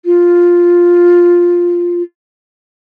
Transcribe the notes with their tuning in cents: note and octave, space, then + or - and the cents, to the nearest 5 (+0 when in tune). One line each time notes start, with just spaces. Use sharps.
F4 +5